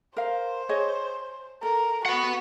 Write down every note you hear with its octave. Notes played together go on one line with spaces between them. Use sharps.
A#4 C5 F5
G#4 C#5 D#5
A4 A#4
F#4 F#5 B5